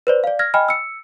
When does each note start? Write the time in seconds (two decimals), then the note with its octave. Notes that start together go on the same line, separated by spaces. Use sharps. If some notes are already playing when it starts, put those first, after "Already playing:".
0.07 B4 C5 D5
0.24 D5 F5
0.39 F6 G#6 A#6
0.54 D#5 G5 G#5 B5 F6
0.69 E6 C#7